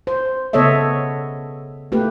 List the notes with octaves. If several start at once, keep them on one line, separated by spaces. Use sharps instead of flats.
C5
C#3 B3 A4 C#5 D#5 E5
A3 A#3 G4 B4